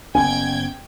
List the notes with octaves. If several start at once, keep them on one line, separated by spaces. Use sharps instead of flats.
F#1 B3 C#4 G5 G#5 G#6